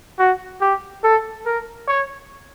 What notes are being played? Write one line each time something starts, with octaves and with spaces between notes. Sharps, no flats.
F#4
G4
A4
A#4
C#5